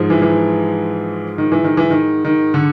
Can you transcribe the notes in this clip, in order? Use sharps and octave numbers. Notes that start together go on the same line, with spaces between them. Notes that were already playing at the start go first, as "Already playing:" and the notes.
Already playing: G#2 F3 G#3
E3
E3
D#3
E3
D#3
E3
D#3
D#3
D3